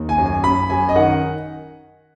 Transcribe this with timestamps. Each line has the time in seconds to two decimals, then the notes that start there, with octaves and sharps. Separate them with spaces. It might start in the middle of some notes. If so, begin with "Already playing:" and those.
Already playing: D#2
0.09 G#5
0.18 F#2
0.26 G#5
0.44 F#2 B5
0.70 F#2 G#5
0.89 D#5
0.95 D#3 F#5